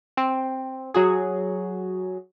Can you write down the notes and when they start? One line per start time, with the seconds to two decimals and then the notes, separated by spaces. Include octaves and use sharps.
0.17 C4
0.94 F#3 F#4 G#4